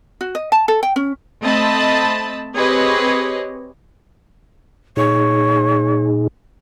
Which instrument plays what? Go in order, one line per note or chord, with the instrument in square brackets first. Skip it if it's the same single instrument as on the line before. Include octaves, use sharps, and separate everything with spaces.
[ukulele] F#4
D#5
A5
A4
G5
C#4
[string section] A3 C4 D#5 A5 B5
C4 G4 G#4 B4 C#5 D#5
[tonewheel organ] A#2 D#4 G#4 [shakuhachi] C#5